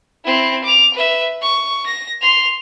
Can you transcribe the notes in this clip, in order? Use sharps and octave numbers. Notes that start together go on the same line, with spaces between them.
C4 E4
D6 F7
B4 E5
C#6
A#6
C6 F7